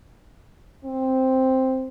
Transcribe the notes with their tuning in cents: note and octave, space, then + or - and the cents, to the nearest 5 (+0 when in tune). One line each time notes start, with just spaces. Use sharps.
C4 +0